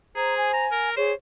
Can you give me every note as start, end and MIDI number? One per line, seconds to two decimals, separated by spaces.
0.16 0.53 68
0.16 0.67 72
0.16 0.34 82
0.38 0.90 80
0.54 0.66 82
0.71 0.95 70
0.97 1.12 68
0.97 1.12 72
0.97 1.14 73